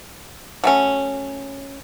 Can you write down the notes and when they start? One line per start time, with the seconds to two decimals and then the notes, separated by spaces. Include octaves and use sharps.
0.64 F#3 A3 C#4